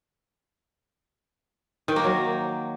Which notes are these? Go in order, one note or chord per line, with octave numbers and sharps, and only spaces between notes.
D#3
A#3
F#3